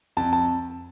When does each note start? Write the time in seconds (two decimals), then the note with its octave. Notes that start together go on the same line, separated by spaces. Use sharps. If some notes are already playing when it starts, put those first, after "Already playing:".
0.17 F2 A5
0.33 A5